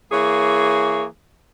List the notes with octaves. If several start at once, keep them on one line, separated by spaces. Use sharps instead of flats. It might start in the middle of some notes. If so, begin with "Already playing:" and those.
E3 A#3 G#4 C#5